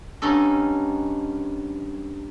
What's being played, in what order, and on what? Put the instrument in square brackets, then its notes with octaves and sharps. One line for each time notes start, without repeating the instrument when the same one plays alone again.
[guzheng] G2 C#4 D#4 F#4 A4 D#5